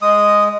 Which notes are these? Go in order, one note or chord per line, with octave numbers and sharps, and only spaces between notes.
G#3 D#6